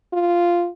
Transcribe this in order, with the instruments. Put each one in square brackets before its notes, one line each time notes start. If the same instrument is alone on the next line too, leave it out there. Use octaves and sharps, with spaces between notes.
[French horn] F4